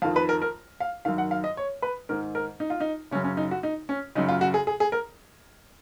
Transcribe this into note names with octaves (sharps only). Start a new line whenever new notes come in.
F2 D#3 F5
B4
A#4
A#4
F5
F#2 D#3 F5
F#5
F5
D#5
C#5
B4
G#2 D#3 A#4
A#4
D#4
F4
D#4
F#2 C#3 C#4
C#4
D#4
F#4
D#4
C#4
F#2 C#3 D#4
F4
F#4
G#4
G#4
G#4
A#4